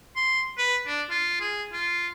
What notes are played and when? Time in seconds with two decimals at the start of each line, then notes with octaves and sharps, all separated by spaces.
0.16 C6
0.58 B4
0.87 D4
1.10 F4
1.40 G#4
1.73 F4